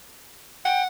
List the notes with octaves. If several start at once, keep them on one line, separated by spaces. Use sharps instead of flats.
F#5 G5